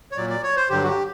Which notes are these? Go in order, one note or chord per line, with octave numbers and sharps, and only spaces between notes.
C#5
A#2 F#3 D5
D5
C#5
C5
G2 D3 F#3 G4
F#4
G4